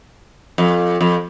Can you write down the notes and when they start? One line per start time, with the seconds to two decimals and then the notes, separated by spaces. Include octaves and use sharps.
0.58 F2
1.01 F2